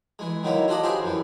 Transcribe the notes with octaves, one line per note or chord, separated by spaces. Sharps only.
E3 G#3
D#3 F#3 A#3 E4
F4 F#4 A4 D5 D#5
G4 G#4 B4 C5 F5
F#2 E3